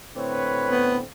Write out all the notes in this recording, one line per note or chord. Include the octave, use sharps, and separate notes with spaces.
A2 D3 C4 B4 C#5
B3